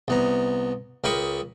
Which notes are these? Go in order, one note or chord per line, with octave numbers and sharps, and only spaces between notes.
C2 B3 A#5
C#2 A#4 G5 B5 C#6 D#6